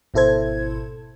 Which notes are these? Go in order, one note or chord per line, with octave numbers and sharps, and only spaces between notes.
G#1 B2 E4 A4 C5 G#6